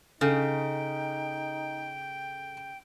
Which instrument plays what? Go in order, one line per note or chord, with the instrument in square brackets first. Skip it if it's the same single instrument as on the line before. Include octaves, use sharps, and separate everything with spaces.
[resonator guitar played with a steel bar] C#3 [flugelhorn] D#4 [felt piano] A4 [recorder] G5